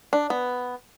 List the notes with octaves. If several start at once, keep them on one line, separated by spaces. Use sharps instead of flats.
D4
B3